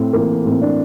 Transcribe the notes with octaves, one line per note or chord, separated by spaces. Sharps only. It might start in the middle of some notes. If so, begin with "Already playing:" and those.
Already playing: A2 C4
E3 A#3
A2 C4
D4